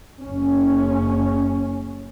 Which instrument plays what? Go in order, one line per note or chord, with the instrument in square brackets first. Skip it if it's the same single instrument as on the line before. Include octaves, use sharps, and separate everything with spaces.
[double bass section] F#1 C#4